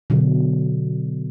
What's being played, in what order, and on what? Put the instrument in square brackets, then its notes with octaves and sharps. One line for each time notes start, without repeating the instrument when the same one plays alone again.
[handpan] B2 D3 F#3